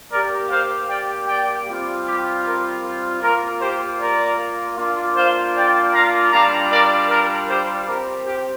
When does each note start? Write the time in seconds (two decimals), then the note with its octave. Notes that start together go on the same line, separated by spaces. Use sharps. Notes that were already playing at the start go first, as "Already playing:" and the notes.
0.12 A#3 G4 A#4 D5
0.50 C5 F5
0.89 D5 G5
1.28 D5 G5
1.67 G3 C4 F4
2.06 G4
2.45 A#4
3.22 A#3 F4 A#4
3.61 G4 C5
4.00 A#4 D5
4.77 A#3 D4 F4
5.16 C5 F5
5.55 D5 G5
5.94 F5 A#5
6.32 G3 D4 F4 F5 A#5
6.72 A#4 D5
7.10 A#4
7.49 G4 C5
7.87 C4 G4 A#4
8.27 G4